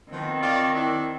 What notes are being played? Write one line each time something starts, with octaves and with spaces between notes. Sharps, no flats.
D#3 F3 B3 C4
F4 C#5 D5
D4 E4